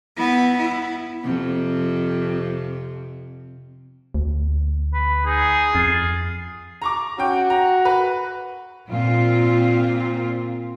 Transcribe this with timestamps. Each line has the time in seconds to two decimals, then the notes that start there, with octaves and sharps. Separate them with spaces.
0.17 B3 E4
0.57 E4
1.23 F2 C3
4.14 D2
4.94 B4
5.26 D#4 G#4
5.75 F2 F4
6.82 A#5 C#6 D6
7.18 C#4 F#4 G5
7.50 A#5
7.85 B4
8.89 A#2 C4 F4